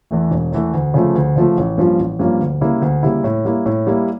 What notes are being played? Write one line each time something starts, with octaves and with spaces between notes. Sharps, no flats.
E2 E3 A3
E1
E2 E3 A3
D2
C#3 F3 A3
D2
C#3 F3 A3
A1
G2 F3 A#3 C#4
A1
G2 F3 A#3 C#4
D2
C#3 G3 A#3 E4
D2
C#3 G3 A#3 E4
A2
G3 A#3 E4
A2
G3 A#3 E4